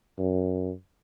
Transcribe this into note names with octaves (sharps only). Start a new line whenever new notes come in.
F#2